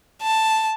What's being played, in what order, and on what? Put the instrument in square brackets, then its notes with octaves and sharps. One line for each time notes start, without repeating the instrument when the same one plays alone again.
[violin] A5